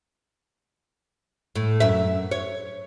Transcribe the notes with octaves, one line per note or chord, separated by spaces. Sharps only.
A2
F#2 E5
C#5